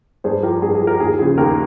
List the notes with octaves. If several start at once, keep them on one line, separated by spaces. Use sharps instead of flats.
G2 G#4 C5
F3 G4 A#4
G2 G#4
G#4
F3
G4 A#4
D#2 G#4
C#3 F3 G#4
D#2 G4 A#4